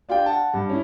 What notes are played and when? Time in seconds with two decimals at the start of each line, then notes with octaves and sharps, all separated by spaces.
0.09 D4 F4 G4 G5
0.26 F#5 A5
0.54 G2
0.69 C#4 E4